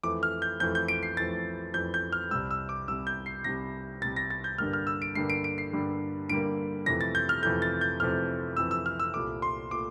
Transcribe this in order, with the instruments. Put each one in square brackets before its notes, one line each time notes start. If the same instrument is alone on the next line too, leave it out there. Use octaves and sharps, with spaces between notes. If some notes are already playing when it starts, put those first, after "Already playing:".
[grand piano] F2 E3 A3 D6
F6
G6
F2 E3 A3 G6
G6
D7
C7
F2 E3 A3 A6
F2 E3 A3 G6
G6
F6
C2 C3 G3 E6
E6
D6
C2 C3 G3 E6
G6
C7
C2 C3 G3 A#6
C2 C3 G3 A6
A#6
A6
G6
G2 D3 G3 A#3 F6
F6
E6
D7
G2 D3 G3 A#3 C7
D7
D7
C7
G2 D3 G3 A#3
G2 D3 G3 A#3 D7
F2 C3 E3 A3 A#6
A6
G6
F6
F2 C3 E3 A3 G6
A6
G6
F2 C3 E3 A3 F6
F2 C3 E3 A3 E6
E6
F6
E6
C2 A#2 A3 D6
C6
A#2 A3 D6